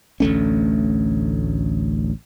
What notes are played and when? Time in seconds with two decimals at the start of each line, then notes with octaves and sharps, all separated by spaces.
0.20 A1 D2 A3 C#4